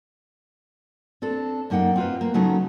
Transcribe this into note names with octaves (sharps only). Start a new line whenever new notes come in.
C4 D4 A4
F#2 A#3 D#4 F#5 G5
C4 F4 B4
A#3
C#3 F#3 A3 B3 C#4 D#4